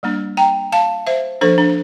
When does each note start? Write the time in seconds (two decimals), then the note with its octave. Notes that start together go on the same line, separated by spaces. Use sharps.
0.03 G3 A#3 D4
0.37 G5 A#5
0.72 F5 A5
1.07 C5 E5
1.41 F3 A#3 D4 A4 C5
1.58 D4